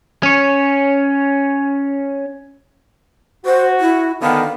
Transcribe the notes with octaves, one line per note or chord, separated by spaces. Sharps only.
C#4 C#5
F#4 C5
E4
D3 D#3 B3 F5